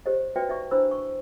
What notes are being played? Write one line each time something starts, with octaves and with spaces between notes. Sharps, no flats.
G4 C5 C#5 D#5
F#4 B4 C#5 D5 E5 G5
D#4 D5 E5 C#6
D4 E4 C5 B5 E6
C#6